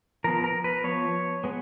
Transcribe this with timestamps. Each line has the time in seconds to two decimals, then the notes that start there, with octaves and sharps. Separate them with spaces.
0.24 F3 B3 A#4
0.44 A#4
0.64 B4
0.84 F3 B3 C#5
1.44 G#3 B3